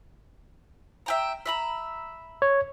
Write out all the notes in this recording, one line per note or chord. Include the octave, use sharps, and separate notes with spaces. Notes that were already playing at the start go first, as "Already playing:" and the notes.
E5 G5 A#5
E5 A#5 B5
C#5